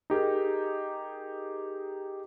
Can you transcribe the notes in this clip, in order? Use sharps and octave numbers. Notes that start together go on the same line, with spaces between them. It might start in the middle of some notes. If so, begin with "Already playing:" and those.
D#4 G4 G#4 A#4